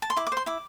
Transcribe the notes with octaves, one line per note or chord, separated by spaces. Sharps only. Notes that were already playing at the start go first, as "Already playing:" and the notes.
A5
C6
E4 D6
D6
C5 C6
E4 D6